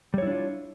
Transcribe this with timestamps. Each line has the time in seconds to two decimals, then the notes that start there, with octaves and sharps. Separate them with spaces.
0.14 G3
0.18 C#5
0.22 E4
0.27 D4
0.31 F4